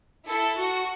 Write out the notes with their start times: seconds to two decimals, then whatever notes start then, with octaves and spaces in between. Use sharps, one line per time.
0.26 E4 A4
0.58 F#4